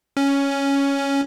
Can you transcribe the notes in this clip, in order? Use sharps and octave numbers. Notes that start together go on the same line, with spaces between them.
C#4